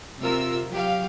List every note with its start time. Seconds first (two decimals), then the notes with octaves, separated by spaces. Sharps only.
0.20 C3 F4 A#4 E6
0.71 F#3 G4 F5